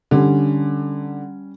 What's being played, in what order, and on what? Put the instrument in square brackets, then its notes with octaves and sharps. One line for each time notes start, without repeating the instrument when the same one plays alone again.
[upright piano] D3 [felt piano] G3 C#4